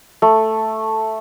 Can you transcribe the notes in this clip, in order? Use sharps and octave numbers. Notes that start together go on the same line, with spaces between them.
A3